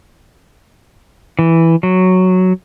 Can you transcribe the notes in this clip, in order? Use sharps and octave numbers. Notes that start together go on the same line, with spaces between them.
E3
F#3